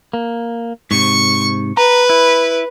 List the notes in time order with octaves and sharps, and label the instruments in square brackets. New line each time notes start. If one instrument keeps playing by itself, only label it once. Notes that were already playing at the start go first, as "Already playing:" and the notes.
[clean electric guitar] A#3
[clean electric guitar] G#2 C3 [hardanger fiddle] C#6
[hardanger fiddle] B4 [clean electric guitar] A#5
[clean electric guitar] E4